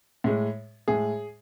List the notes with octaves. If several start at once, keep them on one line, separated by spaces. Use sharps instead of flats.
A2 G#3
A2 G#3 G#4